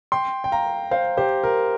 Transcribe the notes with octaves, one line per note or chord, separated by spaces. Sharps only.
G5 C6
G5
F5 A#5
C5 F5
G4 C5
A#4